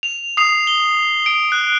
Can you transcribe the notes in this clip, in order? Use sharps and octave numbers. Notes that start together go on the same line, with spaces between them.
F7
D#6 C7 F7
G7
D7
F#6